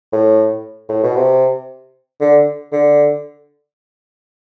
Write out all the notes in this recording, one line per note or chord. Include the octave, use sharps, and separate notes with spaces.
A2
A2
B2
C3
D3
D3